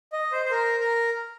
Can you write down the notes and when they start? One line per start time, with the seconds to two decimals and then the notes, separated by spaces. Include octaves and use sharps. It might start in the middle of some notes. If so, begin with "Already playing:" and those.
0.13 D#5
0.32 C5
0.45 C5
0.51 A#4
0.80 A#4